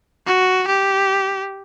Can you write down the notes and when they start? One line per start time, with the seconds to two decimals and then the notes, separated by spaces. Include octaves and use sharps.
0.27 F#4
0.67 G4